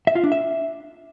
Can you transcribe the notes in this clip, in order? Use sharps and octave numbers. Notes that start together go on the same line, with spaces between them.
E5
F4
D4
E5